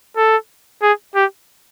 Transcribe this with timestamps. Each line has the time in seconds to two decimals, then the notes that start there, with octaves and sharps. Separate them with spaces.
0.17 A4
0.82 G#4
1.15 G4